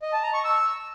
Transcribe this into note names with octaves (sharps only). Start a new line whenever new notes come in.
D#5
A5
A#5
C#6
E6